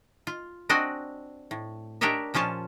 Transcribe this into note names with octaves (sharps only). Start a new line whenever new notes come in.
F4
C4 D4 F#4 D#5 G#5
A2
D4 G4 A#4 C#5 D#5 E5
A#2 F3 C#4 F4 A5